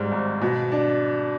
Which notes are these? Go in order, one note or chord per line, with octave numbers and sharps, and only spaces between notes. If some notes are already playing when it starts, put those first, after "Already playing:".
Already playing: G#1 G#2 G3
G#1
B2
D4